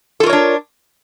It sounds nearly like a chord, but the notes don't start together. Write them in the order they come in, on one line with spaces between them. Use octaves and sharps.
A4 F4 A#4 C#5 D4